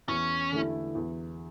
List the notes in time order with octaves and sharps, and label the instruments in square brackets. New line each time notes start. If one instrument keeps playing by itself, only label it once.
[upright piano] E2 [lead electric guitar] C#4
[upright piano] D3 A3 E4
E2